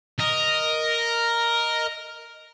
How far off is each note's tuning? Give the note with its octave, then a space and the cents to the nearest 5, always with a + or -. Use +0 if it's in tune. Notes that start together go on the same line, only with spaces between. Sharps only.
A#4 +0 D#5 +0